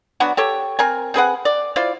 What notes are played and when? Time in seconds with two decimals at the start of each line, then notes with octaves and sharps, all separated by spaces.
0.20 F#3 B3 D4 F#4
0.37 G4 A4 C#5
0.79 C4 A#4 G#5
1.14 C4 G#4 B4 F#5
1.45 D5
1.76 E4 F4 C5 D5